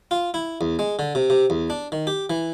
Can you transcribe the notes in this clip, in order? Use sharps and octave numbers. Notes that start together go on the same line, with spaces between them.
F4
E4
E2
G#3
D3
C3
C3
E2
D4
D#3
G4
E3